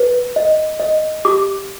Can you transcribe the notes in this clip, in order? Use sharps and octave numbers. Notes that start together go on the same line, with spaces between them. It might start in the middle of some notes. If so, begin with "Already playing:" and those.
Already playing: B4
D#5
D#5
G4 D6